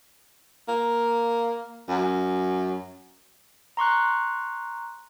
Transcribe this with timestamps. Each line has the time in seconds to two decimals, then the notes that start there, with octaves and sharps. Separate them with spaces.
0.68 A#3
1.88 F#2
3.77 A#5 C6 C#6 F#6